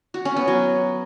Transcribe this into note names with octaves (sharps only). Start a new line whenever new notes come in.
F#4
C#4
B3
F#3